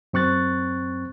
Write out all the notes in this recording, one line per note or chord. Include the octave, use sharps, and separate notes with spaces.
F#2 C4 C#6 F#6 A6